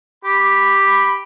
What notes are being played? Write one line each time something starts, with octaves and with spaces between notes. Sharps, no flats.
G4 B5